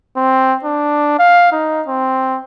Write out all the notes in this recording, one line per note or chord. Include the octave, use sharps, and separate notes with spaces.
C4
D4
F5
D#4
C4